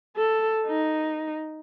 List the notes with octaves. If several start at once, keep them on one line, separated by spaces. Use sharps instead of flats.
A4
D#4